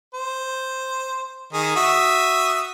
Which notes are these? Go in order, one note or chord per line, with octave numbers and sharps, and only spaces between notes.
C5
D#3 G#4
F#4 E5 D#6